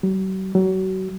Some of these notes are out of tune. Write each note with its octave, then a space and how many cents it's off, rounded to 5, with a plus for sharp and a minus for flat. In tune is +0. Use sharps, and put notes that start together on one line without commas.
F#3 +45
F#3 +30